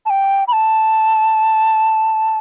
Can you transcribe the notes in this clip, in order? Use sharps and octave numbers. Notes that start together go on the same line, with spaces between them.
A5
G5
B5
A5